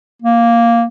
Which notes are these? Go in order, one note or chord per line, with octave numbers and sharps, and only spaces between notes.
A#3